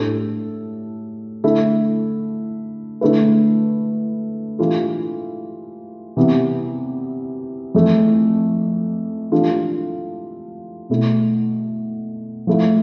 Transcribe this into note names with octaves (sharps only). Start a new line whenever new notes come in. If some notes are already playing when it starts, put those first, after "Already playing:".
Already playing: A2 G3 D4 A4
D3 A3 E4 A4
D3 A3 E4 B4
E3 G3 D4 F4 A4
C3 E3 G3 B3 E4
F2 E3 A3
E3 G3 D4 F4 A4
B2 A3 E4
F3 A3 E4